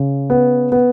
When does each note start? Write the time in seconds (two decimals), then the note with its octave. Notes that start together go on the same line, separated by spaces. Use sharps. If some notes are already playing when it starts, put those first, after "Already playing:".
Already playing: C#3
0.30 B3
0.72 B3